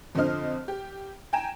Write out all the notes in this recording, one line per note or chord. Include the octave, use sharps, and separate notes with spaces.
F2 D3 F4 C5 D#5 F6
G4
G5 G#5 A#5 E7